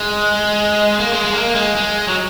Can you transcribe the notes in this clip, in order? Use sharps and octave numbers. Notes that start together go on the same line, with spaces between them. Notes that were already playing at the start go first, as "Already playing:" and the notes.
Already playing: G#3
A#3
G#3
G#3
A#3
G#3
G#3
F#3